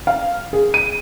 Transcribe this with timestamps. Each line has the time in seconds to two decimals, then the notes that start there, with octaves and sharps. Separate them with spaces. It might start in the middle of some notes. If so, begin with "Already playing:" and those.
0.07 F5
0.53 G#4
0.74 D#7